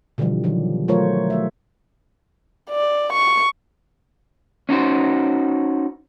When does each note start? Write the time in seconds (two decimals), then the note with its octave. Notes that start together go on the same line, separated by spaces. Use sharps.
0.18 B2 D3 E3 F3 G3
0.44 D#3 F3 F#3
0.88 F#3 A3 F4 A#4 C5 C#5
1.30 A3 E5
2.70 D5
3.13 C#6
4.69 C#4 D#4 F#4 C5